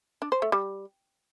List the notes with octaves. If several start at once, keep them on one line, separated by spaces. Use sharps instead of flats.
D4
C5
A3
G3